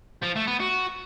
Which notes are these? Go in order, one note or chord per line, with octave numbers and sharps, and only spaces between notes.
F3
A3
B3
F#4